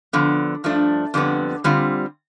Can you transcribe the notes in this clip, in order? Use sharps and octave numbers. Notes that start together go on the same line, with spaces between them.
D3 F3 B3
G2 F3 A3 D4
F2 D3 G3 B3
D3 G3 C4 F4